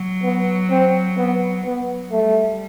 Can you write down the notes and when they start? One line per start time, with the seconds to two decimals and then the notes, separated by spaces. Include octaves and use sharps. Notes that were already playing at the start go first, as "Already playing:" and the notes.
Already playing: F#3
0.23 B3
0.70 C4
1.17 B3
1.64 F#3 B3
2.11 G3 A3